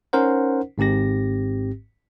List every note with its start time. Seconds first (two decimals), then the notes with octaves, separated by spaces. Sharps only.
0.13 C#4 D#4 A#4 C5 F#5
0.78 G#1 G#2 C4 G4 A#6